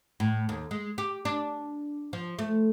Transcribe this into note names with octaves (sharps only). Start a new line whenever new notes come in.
A2
D#2
G#3
G4
D4
F3
A3